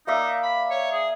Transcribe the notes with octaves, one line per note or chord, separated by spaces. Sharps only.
A#3 D#4 D5 E5
B5
C#5
G#4